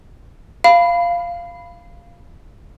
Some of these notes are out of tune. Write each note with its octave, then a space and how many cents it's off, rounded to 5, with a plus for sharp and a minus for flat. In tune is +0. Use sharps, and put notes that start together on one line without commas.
F5 -10 B5 +0